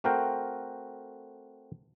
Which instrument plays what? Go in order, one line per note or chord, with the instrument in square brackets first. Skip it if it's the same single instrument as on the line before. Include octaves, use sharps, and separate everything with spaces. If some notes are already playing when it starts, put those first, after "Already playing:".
[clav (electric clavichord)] A3 C4 F#4 A#4 F5 G5